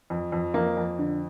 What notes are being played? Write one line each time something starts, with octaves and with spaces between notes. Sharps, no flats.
F2
F2
F2 A#3
F2
D3